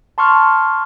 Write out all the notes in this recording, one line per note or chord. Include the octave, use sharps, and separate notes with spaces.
A5 C6 C#6 F6